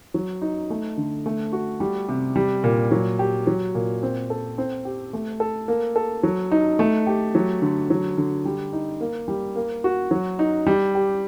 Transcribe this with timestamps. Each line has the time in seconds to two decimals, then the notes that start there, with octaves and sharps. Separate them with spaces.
0.14 F#3
0.42 D#4
0.70 A3
0.97 D3
1.26 A3
1.53 F#4
1.80 G3
2.09 C3
2.36 G3
2.64 A#2
2.91 F#3
3.19 G4
3.47 F#3
3.75 A#2
4.03 C4
4.30 A4
4.58 C4
4.85 G4
5.13 A3
5.40 A4
5.68 A#3
5.96 A4
6.23 F#3
6.52 D#4
6.79 A3
7.07 G4
7.35 F#3
7.62 D3
7.90 F#3
8.17 D3
8.45 G3
8.73 D#4
9.01 A#3
9.28 G3
9.56 A#3
9.84 F#4
10.11 F#3
10.39 D#4
10.66 G3
10.95 G4